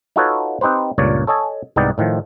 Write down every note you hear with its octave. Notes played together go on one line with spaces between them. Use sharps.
D#4 F4 F#4 A4 B4 C#5
C4 D#4 G4 B4 C5
C#2 G2 A#2 C#5 D5
A4 C#5 D#5 G#5 A5
C2 G#2 B3 D#4 D5 G5
A2 D#3 F3